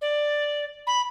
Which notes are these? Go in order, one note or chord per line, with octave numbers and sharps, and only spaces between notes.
D5
B5